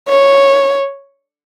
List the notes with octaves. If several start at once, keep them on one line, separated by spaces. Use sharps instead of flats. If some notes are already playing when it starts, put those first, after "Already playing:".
C#5